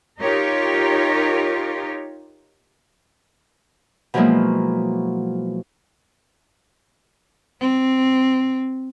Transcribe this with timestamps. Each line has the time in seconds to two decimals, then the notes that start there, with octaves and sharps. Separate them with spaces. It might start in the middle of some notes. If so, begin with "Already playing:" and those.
0.20 D#4 F4 G4 A#4 C#5
4.14 B2 F3 F#3 G#3 A#3 E4
7.61 C4